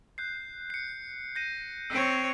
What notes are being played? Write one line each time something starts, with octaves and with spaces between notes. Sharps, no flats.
F#6 G6 C7
C7 C#7
G6 A#6 D#7
C4 C#5 E6